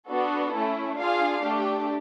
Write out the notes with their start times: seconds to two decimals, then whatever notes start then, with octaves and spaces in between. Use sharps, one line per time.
0.09 B3 D4 F#4 A4
0.54 A3 C#4 E4
0.98 D4 F4 G#4 F5
1.43 A3 D4 G4